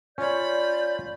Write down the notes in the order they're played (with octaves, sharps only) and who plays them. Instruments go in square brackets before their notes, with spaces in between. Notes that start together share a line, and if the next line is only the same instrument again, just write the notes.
[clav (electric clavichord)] C#4 C#5 [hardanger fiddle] F4 B5 [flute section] D5 G6